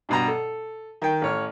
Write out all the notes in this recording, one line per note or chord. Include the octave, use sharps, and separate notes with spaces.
G2 B2 A#5
A4
D#3 G5
A1 C#5 F6